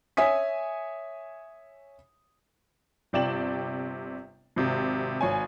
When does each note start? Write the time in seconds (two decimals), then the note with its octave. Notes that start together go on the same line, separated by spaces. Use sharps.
0.17 C#5 E5 G#5 D#6 B6
3.13 G1 C3 D5 G5 E7 F#7
4.56 G#1 C3
5.21 G#1 C#5 G#5